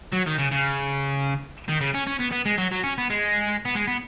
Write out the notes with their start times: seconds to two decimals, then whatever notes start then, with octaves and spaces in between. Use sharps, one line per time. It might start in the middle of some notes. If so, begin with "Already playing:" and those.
0.13 F#3
0.26 D#3
0.38 C#3
0.51 C#3
1.69 D#3
1.81 C#3
1.94 C#4
2.07 C#4
2.20 B3
2.32 B3
2.46 G#3
2.58 F#3
2.72 F#3
2.84 C#4
2.98 B3
3.10 G#3
3.65 B3
3.75 G#3
3.87 B3